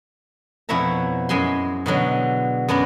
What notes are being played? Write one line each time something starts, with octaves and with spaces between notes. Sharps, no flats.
F2 B2 E4 C#5 E5 A#5
F#2 G#3 G#5 B5 C6
B2 D3 F#3 G#3
F#2 B3 D4 A#4